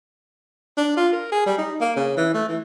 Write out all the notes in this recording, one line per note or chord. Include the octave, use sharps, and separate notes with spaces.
D4
F4
A#4
G#4
G3
D#4
A#3
C#3
E3
A3
E3